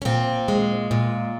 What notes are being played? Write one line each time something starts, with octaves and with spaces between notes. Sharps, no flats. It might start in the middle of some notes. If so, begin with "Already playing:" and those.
C#4
A#2 C4
G#3
A#2